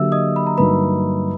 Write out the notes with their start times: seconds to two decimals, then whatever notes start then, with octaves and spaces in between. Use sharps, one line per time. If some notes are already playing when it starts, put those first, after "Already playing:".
Already playing: D3 F#3 A#3 D4 G4 E5 E6
0.12 D#5 D#6
0.36 B5
0.47 A#5
0.58 G2 D3 F#3 A#3 D#4 B4 B5